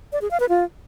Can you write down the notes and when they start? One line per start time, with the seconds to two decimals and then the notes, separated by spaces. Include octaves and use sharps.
0.13 D5
0.22 G#4
0.31 F5
0.40 B4
0.49 F4